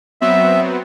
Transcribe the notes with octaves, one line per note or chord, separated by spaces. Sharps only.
F#3 B3 C4 E5